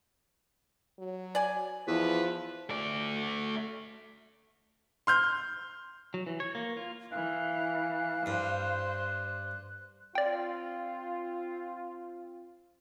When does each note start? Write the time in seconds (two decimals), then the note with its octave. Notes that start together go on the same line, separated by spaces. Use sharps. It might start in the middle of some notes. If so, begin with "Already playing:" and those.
0.99 F#3
1.35 D5 G#5
1.87 E2 F3 B4
2.70 A3 D5
5.07 C6 F6 G6
6.14 F#3
6.27 E3
6.40 C#5
6.55 A#3
6.77 F4
7.12 E3 F5 F#6
8.26 G2 C5
10.15 C4 F4 D5 G5